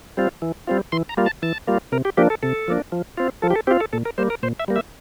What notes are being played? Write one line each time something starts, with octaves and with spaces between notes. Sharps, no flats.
G3 C4 F4
E3
G3 C4 F4
E3 C6
A#5
G3 A#3 F4
A5
E3 A5
G3 A#3 F4
C3 A#4
G4
F3 A#3 D4 G4
A4
C3 A4
F3 A#3 D4
F3
C4 F4
F3 A4
G4
A4
C4 F4 G4
A4
A#2 A4
A#4
G3 A#3 C5
A#4
A#2 C5
E5
G3 A#3
E5